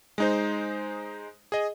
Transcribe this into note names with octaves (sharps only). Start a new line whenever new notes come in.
G#3 D#4 C5
G#4 D#5